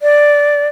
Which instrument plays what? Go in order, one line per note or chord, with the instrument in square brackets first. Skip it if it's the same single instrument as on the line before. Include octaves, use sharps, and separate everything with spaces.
[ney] D5